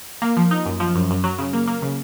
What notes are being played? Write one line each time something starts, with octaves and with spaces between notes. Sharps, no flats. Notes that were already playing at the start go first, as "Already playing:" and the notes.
A#3
F3
D#4
F#2
F3
F#2
F#2
F#3
C#3
A#3
A#3
C#3